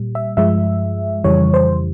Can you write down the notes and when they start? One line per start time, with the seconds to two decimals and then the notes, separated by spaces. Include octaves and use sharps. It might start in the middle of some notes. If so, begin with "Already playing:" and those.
Already playing: A#2 G3
0.15 E5
0.37 G2 F3 G#3 E5
1.24 F2 C#3 E3 G3 C#5
1.54 C5